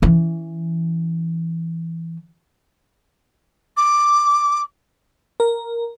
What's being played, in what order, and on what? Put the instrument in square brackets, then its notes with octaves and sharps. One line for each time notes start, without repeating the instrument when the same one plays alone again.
[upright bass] E3 C#4
[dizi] D6
[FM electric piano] A#4